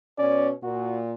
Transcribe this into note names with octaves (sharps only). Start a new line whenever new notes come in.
B2 C#4 D5
A#2 F#4